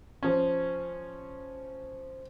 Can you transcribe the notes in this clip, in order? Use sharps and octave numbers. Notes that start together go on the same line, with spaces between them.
F3 C#4